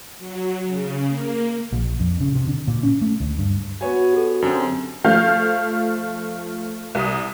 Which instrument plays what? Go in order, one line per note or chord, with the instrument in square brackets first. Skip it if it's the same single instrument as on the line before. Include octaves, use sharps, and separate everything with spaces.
[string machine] F#3
C#3
A#3
[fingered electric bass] A#1
F2
C#3
C3
D3
A#2
C#4
A3
D2
G2
[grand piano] B3 C#5 G#5 [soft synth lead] F#4
[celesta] G4 A4
[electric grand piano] F#2 D3 C4
[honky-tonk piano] F3 A3 F5 G6
C2 D#6